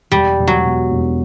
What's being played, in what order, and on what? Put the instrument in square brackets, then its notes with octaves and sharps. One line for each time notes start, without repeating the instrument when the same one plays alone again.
[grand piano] E1 [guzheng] G3
[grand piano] E1
[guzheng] F#3
[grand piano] B2
E1